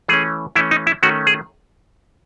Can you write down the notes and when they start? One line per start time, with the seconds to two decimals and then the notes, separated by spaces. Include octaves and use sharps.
0.08 E3 A3 C#4 G#4
0.55 E3 A3 C#4 E4
0.71 D#4
0.87 E4
1.03 D#3 A3 C#4 F#4
1.27 G#4